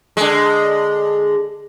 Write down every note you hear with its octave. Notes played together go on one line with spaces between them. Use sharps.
D3 G#3